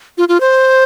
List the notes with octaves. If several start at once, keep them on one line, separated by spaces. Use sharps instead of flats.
F4
F4
C5